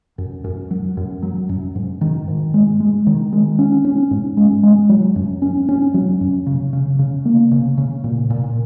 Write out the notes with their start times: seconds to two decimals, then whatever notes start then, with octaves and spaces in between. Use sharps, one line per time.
0.18 F#2
0.44 F#2
0.71 F#3
0.97 F#2
1.23 F#3
1.49 F#2
1.75 G#2
2.01 D#3
2.28 G#2
2.54 G#3
2.80 G#3
3.07 D#3
3.33 G#3
3.59 C#4
3.85 C#4
4.11 G#2
4.37 G#3
4.63 G#3
4.89 F#3
5.16 F#2
5.42 C#4
5.69 C#4
5.94 F#3
6.21 F#2
6.47 C#3
6.73 C#3
6.99 C#3
7.25 A#3
7.52 C#3
7.78 C#3
8.04 A#2
8.30 A#2